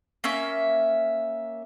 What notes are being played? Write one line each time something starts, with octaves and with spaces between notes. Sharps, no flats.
A#3 C#4 E5